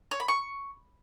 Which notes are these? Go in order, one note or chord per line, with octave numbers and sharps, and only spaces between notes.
C#5
B5
C#6